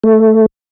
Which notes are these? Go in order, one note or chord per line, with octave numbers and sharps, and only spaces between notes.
A3